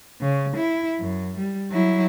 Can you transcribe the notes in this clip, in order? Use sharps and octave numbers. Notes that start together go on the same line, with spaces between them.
C#3
E4
F#2
G3
F#3 E4